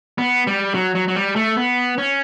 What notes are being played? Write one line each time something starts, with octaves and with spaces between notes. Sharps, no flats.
B3
G3
F#3
F#3
F#3
G3
A3
B3
C#4